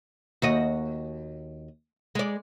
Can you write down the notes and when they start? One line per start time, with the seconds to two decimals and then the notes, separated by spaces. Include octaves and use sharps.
0.42 D#2 F#4 D#5
2.15 G#3 D5